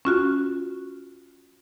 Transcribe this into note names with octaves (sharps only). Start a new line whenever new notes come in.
C#4 F4 F#4